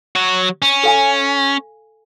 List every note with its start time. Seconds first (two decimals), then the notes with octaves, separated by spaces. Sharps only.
0.16 F#3 F#4
0.62 C#4
0.83 A4 F5 G#5